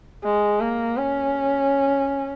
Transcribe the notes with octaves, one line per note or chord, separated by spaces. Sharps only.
G#3
A#3
C#4